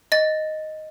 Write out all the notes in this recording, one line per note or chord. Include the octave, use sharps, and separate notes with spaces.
D#5 A6